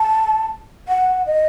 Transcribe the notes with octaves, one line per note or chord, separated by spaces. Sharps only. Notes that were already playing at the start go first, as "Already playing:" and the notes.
Already playing: A5
F#5
D#5